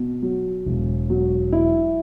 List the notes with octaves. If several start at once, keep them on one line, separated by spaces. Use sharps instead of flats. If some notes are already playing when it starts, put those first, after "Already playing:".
Already playing: B2
F#3
E1
F#3
E4